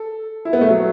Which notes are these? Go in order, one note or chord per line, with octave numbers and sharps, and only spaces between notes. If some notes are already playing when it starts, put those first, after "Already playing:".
Already playing: A4
E4
B3
A3
F#3